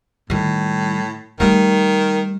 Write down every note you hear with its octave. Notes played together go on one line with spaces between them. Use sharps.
A2 D#3 G3
D#3 G3 A3